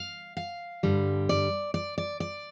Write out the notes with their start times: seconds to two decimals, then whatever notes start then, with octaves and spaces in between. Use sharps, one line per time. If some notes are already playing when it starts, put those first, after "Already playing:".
Already playing: F5
0.37 F5
0.83 G2 D3 G3
1.29 D5
1.74 D5
1.98 D5
2.20 D5